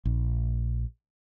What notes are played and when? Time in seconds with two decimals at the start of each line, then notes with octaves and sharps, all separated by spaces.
0.05 A#1